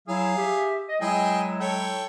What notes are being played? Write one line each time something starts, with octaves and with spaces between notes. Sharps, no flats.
F#3 E4 G#4 F5
G4 E5
D#5
F#3 G#3 E4 G#4 D#5 G5
A4 C#5 G5